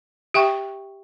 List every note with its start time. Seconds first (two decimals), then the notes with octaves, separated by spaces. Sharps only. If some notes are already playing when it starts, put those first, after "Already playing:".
0.34 G4 E5 G5 C#6